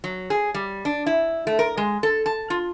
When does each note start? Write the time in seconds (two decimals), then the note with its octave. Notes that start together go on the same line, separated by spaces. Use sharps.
0.04 F#3
0.30 G#4
0.54 G3
0.85 D4
1.06 E4
1.47 A3
1.59 A#4
1.77 G#3
2.03 A4
2.26 A5
2.50 F4